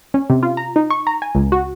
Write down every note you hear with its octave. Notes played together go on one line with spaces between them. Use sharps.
C#4
C3
F4
A#5
D#4
C#6
A#5
G#5
C#2
F#4